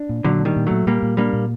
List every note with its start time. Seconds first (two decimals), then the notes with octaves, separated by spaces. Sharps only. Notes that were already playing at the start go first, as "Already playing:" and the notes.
Already playing: D4
0.09 A#2
0.24 A#2 D3 F#3
0.40 D4
0.45 D#3 G3
0.56 A#2
0.67 A#2 F#3 A3
0.87 A#2 G3 A#3
1.02 A#2
1.17 G3 A#3 D4
1.33 A#2